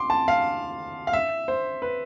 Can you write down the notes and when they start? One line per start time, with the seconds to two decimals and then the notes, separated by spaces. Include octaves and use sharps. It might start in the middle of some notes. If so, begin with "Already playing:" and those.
Already playing: C6 D6
0.10 A5
0.28 F5
1.07 F5
1.13 E5
1.48 C5
1.82 B4